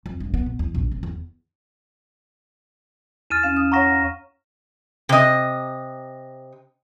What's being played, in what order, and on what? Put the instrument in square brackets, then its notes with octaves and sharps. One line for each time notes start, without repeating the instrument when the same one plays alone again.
[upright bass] F2
G2
B3
A#2
E2
A#1
D#1
E2
[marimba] E2 A6 [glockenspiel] F6 D#7 E7
[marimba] C#4 F5 [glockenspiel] E7
[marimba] D#6
[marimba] C#5 F5 F#5 [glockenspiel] A#5 C#6 A#6
[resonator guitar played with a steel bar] C3 D#5